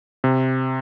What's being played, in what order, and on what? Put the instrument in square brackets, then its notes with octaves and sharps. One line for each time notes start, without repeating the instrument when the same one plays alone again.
[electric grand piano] C3